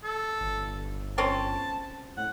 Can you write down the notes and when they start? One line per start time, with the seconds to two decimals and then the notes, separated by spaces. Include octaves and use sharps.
0.04 A4
0.41 G1
1.18 C4 C#4 A5
2.17 A2 F#5